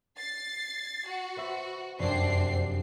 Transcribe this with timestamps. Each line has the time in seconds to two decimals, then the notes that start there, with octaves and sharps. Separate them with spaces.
0.19 A6 C7
1.08 F#4
1.36 B4 C5 E5
1.99 F1 F#2 C4 D4 C7